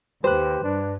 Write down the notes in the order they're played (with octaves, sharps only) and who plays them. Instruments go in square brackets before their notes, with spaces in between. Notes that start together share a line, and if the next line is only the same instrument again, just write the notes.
[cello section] D#2 [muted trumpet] G4 [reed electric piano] B4 F#6 [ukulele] C5
[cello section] G2 [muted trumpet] D4